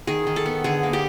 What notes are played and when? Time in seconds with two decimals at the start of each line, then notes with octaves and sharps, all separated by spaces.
0.07 D#3 G#4
0.27 D#3
0.36 A4
0.46 B3
0.64 D3 G#4
0.83 A#3
0.93 G4